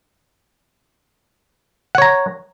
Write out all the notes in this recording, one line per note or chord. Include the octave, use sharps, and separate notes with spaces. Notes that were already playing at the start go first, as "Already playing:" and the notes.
C#5 F#5 A#5